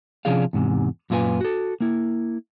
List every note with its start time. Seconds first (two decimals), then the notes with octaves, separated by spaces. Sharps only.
0.25 C3 F3 C#4 D4 G#4 F5
0.53 E2 G#2 C3
1.10 F#2 A#2 F4 G#4 B4 G#5
1.41 F#4 A4
1.80 A#3 E4